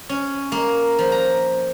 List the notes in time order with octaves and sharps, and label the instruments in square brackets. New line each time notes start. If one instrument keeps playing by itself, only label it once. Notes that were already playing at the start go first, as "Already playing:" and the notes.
[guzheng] C#4
A#3
F3
A#5